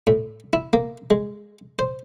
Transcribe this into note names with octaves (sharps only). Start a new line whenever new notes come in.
A2
E4
A#3
G#3
C5